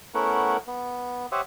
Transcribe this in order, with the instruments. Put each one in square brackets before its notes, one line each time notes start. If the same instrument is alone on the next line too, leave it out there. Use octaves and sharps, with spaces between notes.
[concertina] A3 B3 C#4 E4 A#4 F#5
B3
G4 C5 C#5 E5 F#5 D#6